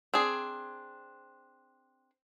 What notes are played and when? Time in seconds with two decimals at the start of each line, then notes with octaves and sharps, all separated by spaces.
0.14 C4 D4 G#4